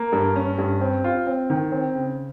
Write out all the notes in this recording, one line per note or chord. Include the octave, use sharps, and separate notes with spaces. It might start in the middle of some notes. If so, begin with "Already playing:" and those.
Already playing: A#3
G2
C#4
G2
C4
F4
C4
D#3
C4
C#3